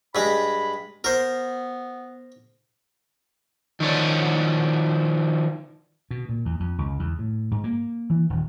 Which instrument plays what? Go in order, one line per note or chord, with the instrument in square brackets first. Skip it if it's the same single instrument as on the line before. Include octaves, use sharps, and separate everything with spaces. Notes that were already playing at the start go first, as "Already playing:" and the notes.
[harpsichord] G2 G#3 [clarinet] B5
[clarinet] B3 [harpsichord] A#4 C5
[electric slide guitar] D#3 F3 C#5 D5
[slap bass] B2
A#2
E2
F2
C#2
E2
A2
G#2
A#3
E3
D#1